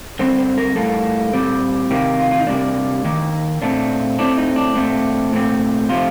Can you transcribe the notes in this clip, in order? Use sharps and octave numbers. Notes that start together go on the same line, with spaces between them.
D3 G3 C4 C5
C5
A#4
A2 G3 A#3 A4
A#2 G3 C4
C3 D#3 A#3 G4
F4
F4
D#4
C3 G3 A#3 D4
D#3 A#3
A#2 A3 C4 D4
A2 A3 C4 D4
D#4
D4
A#2 A3 C4
A#2 A3 C4
C3 F3 A3 F4